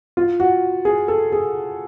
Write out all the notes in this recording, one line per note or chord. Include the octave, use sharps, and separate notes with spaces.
F4
F#4
G#4
A4
G#4